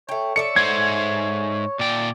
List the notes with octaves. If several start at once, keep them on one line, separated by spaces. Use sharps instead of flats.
A3 C#5 G5
A4 D5 E5 C#7
G#2 C5 F#5 G#6
A#2 D5 G5